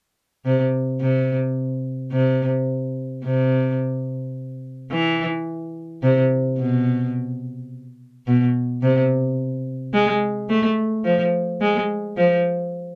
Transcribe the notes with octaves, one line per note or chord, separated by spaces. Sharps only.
C3
C3
C3
C3
E3
C3
B2
B2
C3
G#3
A3
F3
G#3
F3